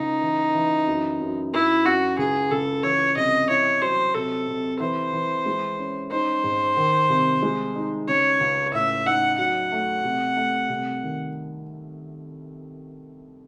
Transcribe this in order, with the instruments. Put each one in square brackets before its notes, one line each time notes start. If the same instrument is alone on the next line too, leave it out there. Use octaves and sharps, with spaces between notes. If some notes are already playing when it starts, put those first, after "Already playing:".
Already playing: [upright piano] C#2 [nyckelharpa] D#4
[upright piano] E3
E3
F#2
F#2
[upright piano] F#2 [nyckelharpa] E4
[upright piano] F#2 [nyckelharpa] F#4
[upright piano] C#2 [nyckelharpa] G#4
[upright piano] C#2 [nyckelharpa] A4
[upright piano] E3 [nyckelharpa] C#5
[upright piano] C2 [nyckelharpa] D#5
[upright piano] E4 [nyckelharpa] C#5
[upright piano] F#3 [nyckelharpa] C5
[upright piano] C3 [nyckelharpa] A4
[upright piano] C3
[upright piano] E3 [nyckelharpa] C5
[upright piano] E3
G#3
C#4
[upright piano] D#4 [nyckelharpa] C5
[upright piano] G#2
D#3
C2
G#3
D#4
[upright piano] C#3 [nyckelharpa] C#5
[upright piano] C#2
[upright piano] A2 [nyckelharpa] E5
[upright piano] D#4 [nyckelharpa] F#5
[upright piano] F#3 [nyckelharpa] F#5
[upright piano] A3
C3
A3
C2
D#3